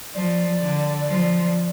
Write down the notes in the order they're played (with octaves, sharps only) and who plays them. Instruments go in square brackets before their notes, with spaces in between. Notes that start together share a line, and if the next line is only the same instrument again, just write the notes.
[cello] F3 [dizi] D5
[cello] D3
F3